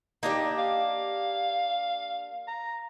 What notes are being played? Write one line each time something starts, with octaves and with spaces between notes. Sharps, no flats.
A#3 D4 D#4 G4
F5
A#5